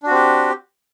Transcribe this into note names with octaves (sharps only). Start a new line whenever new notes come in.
C4 D4 F#4 G4